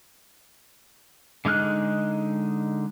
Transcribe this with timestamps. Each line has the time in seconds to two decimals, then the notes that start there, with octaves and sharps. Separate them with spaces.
1.45 D3 G#3 D#4 F6 F#6